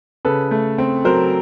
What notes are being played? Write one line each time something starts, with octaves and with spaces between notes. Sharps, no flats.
C#3 A4 B4
A3
C4
F#3 A#4 C5